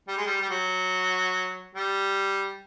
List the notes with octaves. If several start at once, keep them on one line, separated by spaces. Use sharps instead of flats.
G3
G#3
G3
G3
F#3
G3